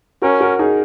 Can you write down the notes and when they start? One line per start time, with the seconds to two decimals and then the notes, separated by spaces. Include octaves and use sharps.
0.22 C#4 F#4 A#4
0.41 F#4 A#4
0.59 D#4 G#4